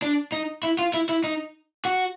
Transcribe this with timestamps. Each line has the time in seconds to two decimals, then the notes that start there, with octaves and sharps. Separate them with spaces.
0.02 D4
0.32 D#4
0.63 E4
0.79 F4
0.94 E4
1.09 E4
1.24 D#4
1.85 F#4